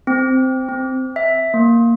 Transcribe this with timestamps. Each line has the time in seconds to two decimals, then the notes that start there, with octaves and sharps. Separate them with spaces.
0.07 C4
0.69 C4
1.16 E5
1.54 A#3